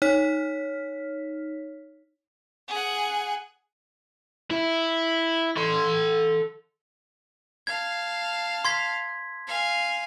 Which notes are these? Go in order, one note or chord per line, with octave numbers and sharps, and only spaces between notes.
D#4 C#5 F6 B6
G#4 F#5
E4
A4 C6
F5 A5 G#6
C6 G#6 B6
F5 G#5